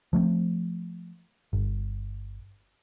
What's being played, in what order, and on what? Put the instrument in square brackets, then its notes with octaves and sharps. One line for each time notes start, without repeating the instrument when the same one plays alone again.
[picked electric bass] F3 A3 A#3 C4
G1